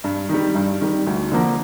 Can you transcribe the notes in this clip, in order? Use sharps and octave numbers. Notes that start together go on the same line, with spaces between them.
G2
D#3 G3
G2
D#3 G3
D2
D3 F3 A#3